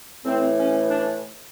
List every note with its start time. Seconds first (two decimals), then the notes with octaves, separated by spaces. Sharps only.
0.25 A2 E3 A3 C4
0.57 C#4
0.88 D4